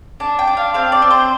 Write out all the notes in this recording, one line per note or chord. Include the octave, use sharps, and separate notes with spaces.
D4 A5
G5
D4
F5
C4 F5
D5
C4
C5